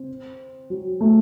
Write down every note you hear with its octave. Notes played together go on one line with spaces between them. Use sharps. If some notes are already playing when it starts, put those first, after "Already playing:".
Already playing: C4
F#3
A3